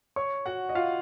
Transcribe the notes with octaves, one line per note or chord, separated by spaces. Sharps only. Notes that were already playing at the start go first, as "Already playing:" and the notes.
C#5 C#6
F#4 F#5
D#5
F4 F5